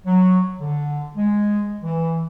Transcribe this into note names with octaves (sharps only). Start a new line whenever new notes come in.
F#3
D3
G#3
E3